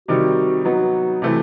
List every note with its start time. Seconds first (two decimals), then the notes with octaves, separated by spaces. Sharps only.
0.08 C3 D#3 G3 D#4 F#4
0.65 F#3 B3 D#4 F#4
1.22 C3 E3 A3 E4 F#4